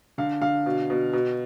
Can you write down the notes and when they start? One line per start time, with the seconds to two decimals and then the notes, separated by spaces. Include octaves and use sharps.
0.18 D3 F5
0.42 D3 F5
0.66 B2
0.90 B2
1.13 B2